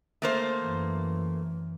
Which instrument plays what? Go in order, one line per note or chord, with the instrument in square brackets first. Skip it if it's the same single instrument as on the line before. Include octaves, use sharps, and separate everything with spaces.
[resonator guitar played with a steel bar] A3 A#3 C5
[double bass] F#2 E3